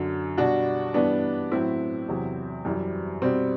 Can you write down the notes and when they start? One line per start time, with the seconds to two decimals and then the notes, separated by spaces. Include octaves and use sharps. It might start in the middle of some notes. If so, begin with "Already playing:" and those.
Already playing: F#2 D3 F#3
0.38 B2 G3 D4 F#4
0.94 G2 E3 G3 B3 D4
1.52 A2 F#3 C4 E4
2.08 E2 C3 F#3
2.65 F#2 E3 G3
3.22 B2 G3 C4